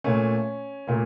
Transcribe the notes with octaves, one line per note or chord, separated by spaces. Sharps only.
A#2 A3 C#4
A#2 A3